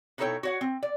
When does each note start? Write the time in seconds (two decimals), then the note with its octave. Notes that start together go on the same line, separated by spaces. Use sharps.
0.18 B2 D#4 E4 A4 C#5 G5
0.43 F#4 C#5 F#5
0.61 C4
0.83 D5